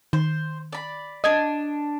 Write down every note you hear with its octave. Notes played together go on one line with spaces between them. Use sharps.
D#3 C5
D5 B5
D4 D#5 D#6 G#6